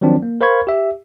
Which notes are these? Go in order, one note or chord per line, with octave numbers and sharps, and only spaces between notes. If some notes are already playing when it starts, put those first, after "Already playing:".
D#3 F3 F#3 C4 D4
A#3
A#4 C5 F5 B5 C#6 G#6
G4 E5